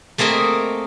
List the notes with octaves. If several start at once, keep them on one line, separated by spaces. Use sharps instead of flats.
A3 A#3 C4 G#4 D#5